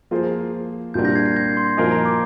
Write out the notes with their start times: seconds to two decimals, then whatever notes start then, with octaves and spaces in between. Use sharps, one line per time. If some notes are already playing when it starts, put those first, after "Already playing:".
0.11 F3 A#3 F4 G#4 C5
0.94 C2 A#2 G3 A#3 D4 G6
1.05 G6 A#6
1.15 G#6 C7
1.26 G#6 C7
1.36 G6 A#6
1.57 C6
1.77 A#2 F3 A#3 D#4 A#4 G#5
1.92 A#5
2.05 D6